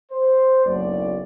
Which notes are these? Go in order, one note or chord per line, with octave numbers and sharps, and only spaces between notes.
C5
F#1 B1 D5